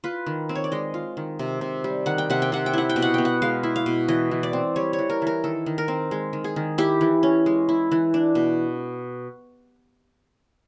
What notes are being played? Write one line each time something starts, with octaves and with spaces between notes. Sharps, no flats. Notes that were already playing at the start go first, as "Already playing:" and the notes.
F4 B4
D#3
C4
C#5
D5
G#3 D#5
F4
D#3
C3
C3
G3
D#3 F#5
G5
C3 F#5
G5
C3 F#5
G5
E4 F#5
G5
B2
F#5
B3 G5
F#5
G#3 F5
E4
F5
B2
E3 D#5
E3
D5
C4
G3 C#5
C#5
E3
A#4
E3 A#4
D#3 A4
D#3
A#4
C4
G#3
D#3
G#4
D#3
E4 G4
E3
C#4
G#3
E4
E3
D4
B2